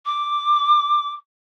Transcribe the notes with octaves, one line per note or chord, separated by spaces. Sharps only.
D6